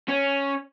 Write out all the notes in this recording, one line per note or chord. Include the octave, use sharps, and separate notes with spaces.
C#4